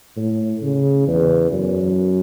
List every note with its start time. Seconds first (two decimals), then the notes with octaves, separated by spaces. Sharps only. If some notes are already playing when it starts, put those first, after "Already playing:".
0.17 A2
0.62 C#3
1.07 E2
1.52 F#2